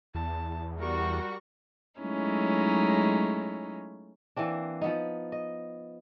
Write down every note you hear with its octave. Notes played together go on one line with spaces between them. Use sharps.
E2 A5
G3 F#4 A#4 C#6
F#3 G#3 A3 C#4 D#4 E4
E3 A#3 C4 D4
F3 B3 D#4
D#5